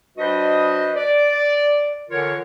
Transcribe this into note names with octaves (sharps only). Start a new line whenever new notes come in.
G3 D4 F#4 B4 C5 D#5
D5
D3 E3 F4 A#4 C#5